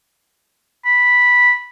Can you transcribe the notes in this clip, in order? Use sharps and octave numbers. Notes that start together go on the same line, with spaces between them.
B5